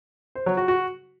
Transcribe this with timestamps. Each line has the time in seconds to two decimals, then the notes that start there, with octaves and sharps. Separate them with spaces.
0.35 C5
0.46 F#3
0.57 F#4
0.68 F#4